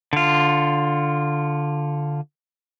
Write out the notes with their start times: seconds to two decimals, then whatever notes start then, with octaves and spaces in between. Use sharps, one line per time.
0.13 D3 F4